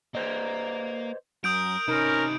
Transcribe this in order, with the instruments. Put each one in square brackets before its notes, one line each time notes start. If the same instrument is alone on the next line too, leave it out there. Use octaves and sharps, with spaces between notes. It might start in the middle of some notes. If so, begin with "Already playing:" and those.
[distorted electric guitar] A#3 [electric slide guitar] B4 C5 D#5
[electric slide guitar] F#2 [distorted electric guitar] A#4 [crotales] D#6 G6 D7
[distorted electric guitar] C3 B4 [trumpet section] C#4 A#4 [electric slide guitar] D#4